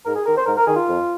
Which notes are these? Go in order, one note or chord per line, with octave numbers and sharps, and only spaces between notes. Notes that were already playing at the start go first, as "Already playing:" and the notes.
G#2 A#4
G#4
D#3 A#4
C5
G#2 A#4
A#4
D#3 G#4
F4
F2